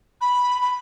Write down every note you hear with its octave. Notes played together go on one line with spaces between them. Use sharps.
B5
B5